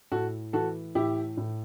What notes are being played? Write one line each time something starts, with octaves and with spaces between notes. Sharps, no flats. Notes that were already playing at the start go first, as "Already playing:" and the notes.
A2 F#4 A4
E3 F#4 A4
A2 E4 G4
A2